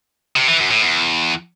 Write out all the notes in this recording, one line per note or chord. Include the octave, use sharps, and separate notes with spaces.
C3
E3
F#2
A2
E2